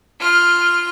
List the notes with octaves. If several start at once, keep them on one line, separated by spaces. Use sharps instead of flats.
F4 F6